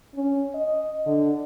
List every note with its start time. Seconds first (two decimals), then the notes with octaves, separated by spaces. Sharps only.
0.15 C#4
0.54 D#5
1.06 D3